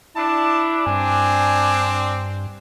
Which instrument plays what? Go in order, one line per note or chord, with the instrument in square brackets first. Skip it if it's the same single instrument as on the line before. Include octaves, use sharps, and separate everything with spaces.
[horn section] D4 [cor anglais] E4 [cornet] A5
[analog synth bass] G2 [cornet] C4 [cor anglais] G#5